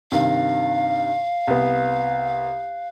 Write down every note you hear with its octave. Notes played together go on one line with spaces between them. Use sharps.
G2 C3 D#3 F5
C2 B3